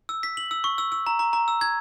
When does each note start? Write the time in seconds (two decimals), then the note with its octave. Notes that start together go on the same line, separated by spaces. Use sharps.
0.09 E6
0.23 B6
0.37 F#7
0.51 E6
0.64 C#6
0.78 E6
0.92 E6
1.07 A#5
1.19 A#5
1.33 A#5
1.48 E6
1.61 G#6